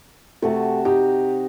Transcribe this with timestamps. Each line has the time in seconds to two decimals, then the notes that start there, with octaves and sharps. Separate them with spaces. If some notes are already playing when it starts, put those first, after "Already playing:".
0.42 C3 A3 F#4 A5
0.85 D#4 G4